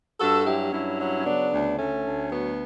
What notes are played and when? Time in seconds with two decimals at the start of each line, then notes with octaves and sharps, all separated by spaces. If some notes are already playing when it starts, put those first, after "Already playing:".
0.20 G2 F#4 A4
0.46 F#3 E4 G4
0.72 G2 C#4 E4
0.99 F#3
1.20 C#4
1.25 C#3 B3 D4
1.52 D2
1.78 D2 A3 C#4
2.04 D2
2.31 F#3 B3